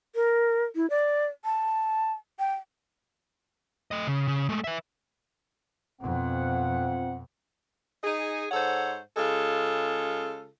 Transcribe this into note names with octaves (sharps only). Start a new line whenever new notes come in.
A#4
E4
D5
A5
G5
A3 D#5
C#3
C#3
G#3 A3
B4 E5
F2 B2 C4 F4 F#5
D#4 G#4
G#2 A4 C5 C#5 F#5
C#3 G#3 F4 A4